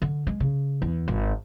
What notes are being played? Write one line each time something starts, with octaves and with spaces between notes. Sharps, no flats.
D3
G#3
C#3
E2
G#1